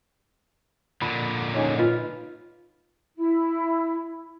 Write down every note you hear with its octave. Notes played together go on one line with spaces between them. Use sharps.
A#2 D3 B5
C#4 D#4 G#4
D#4 F4 B4
E4